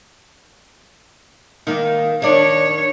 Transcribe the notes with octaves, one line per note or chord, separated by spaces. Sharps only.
D#3 A#3
D#3 D4 C#5